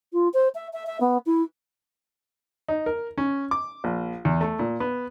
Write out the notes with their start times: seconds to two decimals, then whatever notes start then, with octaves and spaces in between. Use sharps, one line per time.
0.13 F4
0.33 C5
0.54 E5
0.73 E5
0.86 E5
1.00 B3
1.26 E4
2.69 D#4
2.86 A#4
3.18 C#4
3.51 D6
3.84 A#1
4.25 E2
4.41 A3
4.59 A#2
4.80 B3